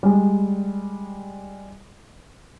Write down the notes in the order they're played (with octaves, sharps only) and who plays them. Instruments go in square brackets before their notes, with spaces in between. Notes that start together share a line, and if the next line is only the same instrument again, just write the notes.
[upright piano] G3 G#3